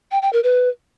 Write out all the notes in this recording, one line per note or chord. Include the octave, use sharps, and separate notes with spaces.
G5
G5
A#4
B4